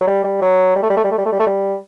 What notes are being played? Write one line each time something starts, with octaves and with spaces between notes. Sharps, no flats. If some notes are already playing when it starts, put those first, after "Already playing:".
F#3
G3
G3
F#3
G3
A3
G3
A3
G3
A3
G3
A3
G3
A3
G3